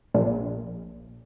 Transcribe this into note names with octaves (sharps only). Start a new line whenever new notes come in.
A#1